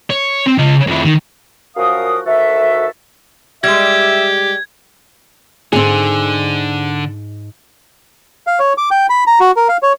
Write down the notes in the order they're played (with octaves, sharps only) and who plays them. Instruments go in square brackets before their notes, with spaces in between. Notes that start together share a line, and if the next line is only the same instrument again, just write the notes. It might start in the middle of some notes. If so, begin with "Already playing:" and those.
[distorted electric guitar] C#5
C4
C#3 D#5
F2 E4
D#3
[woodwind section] F#2 F3 F#4 A#4 F5 D#6
D2 D#3 F#4 A4 E5
[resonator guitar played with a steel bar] G3 G#3 [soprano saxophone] G4 [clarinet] E5 [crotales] G#6
[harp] G#2 [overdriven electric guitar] D3 [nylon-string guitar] C4 G#4
[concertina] F5
C#5
D6
G5
B5
A#5
F#4
A#4
F5
C#5